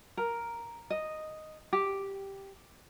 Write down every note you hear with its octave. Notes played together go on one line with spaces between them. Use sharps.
A#4
D#5
G4